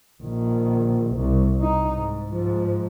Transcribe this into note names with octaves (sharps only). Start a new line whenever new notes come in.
A#1 D#3
C2
D#4
G#2
G#2 F3